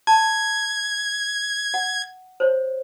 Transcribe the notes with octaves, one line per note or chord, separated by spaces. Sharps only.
A5 G#6
F#5
C5 C#5